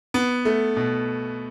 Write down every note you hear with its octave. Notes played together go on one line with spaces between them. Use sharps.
B3
A3
B2